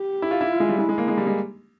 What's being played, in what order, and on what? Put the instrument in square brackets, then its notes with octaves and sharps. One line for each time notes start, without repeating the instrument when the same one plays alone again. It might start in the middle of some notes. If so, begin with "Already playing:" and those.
Already playing: [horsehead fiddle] G4
[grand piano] E4
F4
E4
[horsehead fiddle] F4
[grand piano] G#3
G3
[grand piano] G#3 [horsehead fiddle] E4
[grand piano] G#3
A#3
G#3
G3
G#3